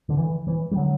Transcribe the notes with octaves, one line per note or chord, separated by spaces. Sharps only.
D3
E3
E3
G3
D3 F#3